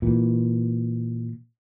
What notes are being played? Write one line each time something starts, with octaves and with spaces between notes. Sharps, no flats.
A#2 E3